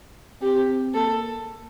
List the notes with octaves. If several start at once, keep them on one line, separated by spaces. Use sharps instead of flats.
C4 G4
A#3 A4